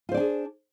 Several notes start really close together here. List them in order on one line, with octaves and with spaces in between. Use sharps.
F4 C5 D5 D4 G#4